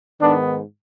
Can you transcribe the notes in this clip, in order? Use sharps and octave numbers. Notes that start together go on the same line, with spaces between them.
G#2 D#3 B3 D4